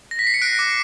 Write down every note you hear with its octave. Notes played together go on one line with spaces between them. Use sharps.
A#6
B6
C7
C#7
F#6 C7 D7
D6